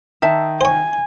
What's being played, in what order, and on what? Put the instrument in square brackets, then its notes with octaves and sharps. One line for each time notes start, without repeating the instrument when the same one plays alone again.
[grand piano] D#3 [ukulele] E5 A5
[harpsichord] C5 C#5 [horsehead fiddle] G#5